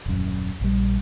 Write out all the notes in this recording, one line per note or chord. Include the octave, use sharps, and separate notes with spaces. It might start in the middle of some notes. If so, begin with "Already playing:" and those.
D#1 F#2
A#1 G3